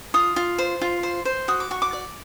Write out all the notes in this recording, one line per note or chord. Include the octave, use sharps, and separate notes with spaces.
F4 D#6
F4
C5
F4
C5
C5
F#4 D#6
D6
F#4 C#6
D6
D5